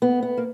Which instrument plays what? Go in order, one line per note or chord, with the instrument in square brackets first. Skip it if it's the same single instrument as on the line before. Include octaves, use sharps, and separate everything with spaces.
[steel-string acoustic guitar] B3
B3
A#3